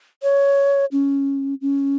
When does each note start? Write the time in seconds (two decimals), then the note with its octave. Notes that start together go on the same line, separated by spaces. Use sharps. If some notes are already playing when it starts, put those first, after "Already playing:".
0.23 C#5
0.92 C#4
1.61 C#4